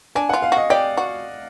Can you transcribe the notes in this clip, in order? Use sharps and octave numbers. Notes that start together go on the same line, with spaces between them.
D4 G#5
F4 F#5
F5
F#4 D#5
G4 D5
F#4